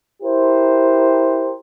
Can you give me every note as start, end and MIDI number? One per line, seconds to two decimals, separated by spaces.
0.23 1.56 64
0.23 1.56 67
0.23 1.56 70
0.23 1.56 72